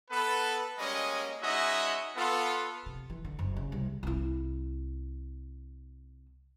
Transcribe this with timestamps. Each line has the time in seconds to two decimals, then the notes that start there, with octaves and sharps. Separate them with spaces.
0.11 B3 A4 B4
0.79 G3 G#3 A#3 C#4 D#5
1.42 G#3 C#4 D#4 F#4 D#5 E5
2.16 B3 F4 A4
2.86 C3
3.10 E3
3.25 D3
3.39 F#1
3.56 C#3
3.72 C2
4.03 C2 E4